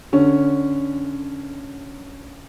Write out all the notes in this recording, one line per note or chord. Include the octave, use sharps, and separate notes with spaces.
D3 C#4